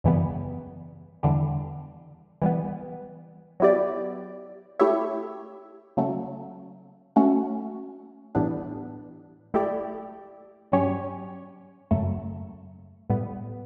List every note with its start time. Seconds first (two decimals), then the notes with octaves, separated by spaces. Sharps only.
0.04 F#2 C#3 E3 G3 B3
1.23 E2 D3 G3
2.42 E3 G3 B3
3.60 F#3 B3 E4 G4 D5
4.79 A3 E4 G4 C#5 E5
5.97 C#3 F#3 A3
7.16 A3 C#4 F#4
8.35 A2 E3 G3 B3 D4
9.54 A3 E4 G4 D5
10.72 G2 F#3 C#4 G4 C#5
11.91 F#2 C#3 F#3 A3
13.10 A2 G3 B3